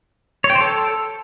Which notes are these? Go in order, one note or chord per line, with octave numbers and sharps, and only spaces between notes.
C#5
G5
C5
A4